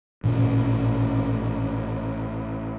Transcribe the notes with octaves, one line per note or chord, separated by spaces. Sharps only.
A1 A#2 C4 C#4